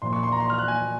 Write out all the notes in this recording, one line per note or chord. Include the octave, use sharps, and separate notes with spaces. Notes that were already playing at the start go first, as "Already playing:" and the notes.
A#2 F3 C6
C#6
C6
A#5
C6
F6
F#6
G#5